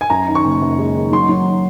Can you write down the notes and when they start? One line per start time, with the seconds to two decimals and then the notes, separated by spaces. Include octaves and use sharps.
0.01 G#5
0.10 F#2 A#5
0.27 D#3
0.35 C#6
0.45 F#1
0.62 F#2
0.79 G#3
0.95 D#3
1.12 F#3 C6
1.29 F#3